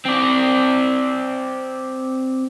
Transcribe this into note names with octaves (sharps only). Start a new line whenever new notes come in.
C4 D5